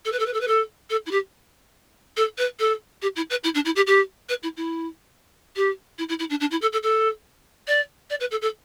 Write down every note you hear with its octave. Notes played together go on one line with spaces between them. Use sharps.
A4
B4
A4
B4
A4
B4
A4
A4
E4
G4
A4
B4
A4
G4
E4
B4
E4
D4
E4
G4
G4
B4
E4
E4
G4
E4
E4
E4
D4
D4
E4
A4
A4
A4
D5
D5
B4
A4
A4